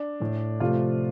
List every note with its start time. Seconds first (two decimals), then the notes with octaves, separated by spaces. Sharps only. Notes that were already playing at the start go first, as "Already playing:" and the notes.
Already playing: D4
0.20 A2 A3
0.60 C3 F3 A3 F4